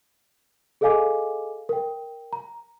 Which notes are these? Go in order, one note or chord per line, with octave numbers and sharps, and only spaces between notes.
G#4 A4 D#5 F5 G#5 D6
A#4 G5
A#5